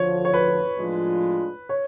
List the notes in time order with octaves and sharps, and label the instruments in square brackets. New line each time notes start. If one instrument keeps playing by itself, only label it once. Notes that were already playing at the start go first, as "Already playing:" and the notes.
Already playing: [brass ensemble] D2 D3 F3 [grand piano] C#5
[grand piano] C#5
B4
[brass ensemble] A2 F3 G#3 D4 F4
[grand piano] C#5